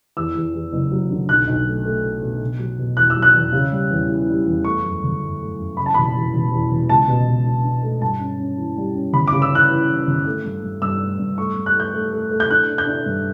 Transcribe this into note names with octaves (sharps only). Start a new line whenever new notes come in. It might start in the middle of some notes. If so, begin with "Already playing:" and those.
E2 E6
E2
E2
F#1
F#3
D3
B1 F#6
B1
A3
A3
A3
B2
B2
F#3
B2
E2 F#6
E6
F#3
F#6
E2
C#3
G3
E2
E3
G3
E2
A3 C#6
F#2
G1
F#2
A3
F#2
C#3 B5
A5
E1 B5
E2
E1
E2
E1
C#2 A5
B2
B2
D4
D4
A3
G2 A5
C#4
C#4
E3
G3
C#4
G1 B5
C#3 D6
E6
E3 F#6
E3
E3
G1
A3
G2
G2
G2 E6
A3
G2
A3 C#6
G2
F#6
A3 G6
A3
A3
A3
G6
D4 F#6
D4
G6
D4
G2